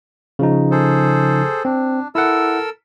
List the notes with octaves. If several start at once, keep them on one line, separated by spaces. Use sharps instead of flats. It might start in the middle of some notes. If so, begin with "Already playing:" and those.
C#3 F3 D#4
G#4 A4 C5
C4 D4
E4 A4 A#4 F#5 E6